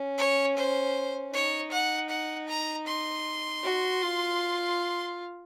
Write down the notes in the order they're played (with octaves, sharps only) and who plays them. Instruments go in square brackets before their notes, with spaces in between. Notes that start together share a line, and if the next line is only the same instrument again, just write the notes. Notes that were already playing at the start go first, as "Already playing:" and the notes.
Already playing: [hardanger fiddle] C#4
[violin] C#5
C5
[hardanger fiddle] D#4 [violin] C#5
[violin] F#5
F#5
A#5
C6
[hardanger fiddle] F#4
F4